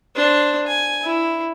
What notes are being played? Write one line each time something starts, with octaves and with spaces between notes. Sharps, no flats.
D4 C5
G#5
E4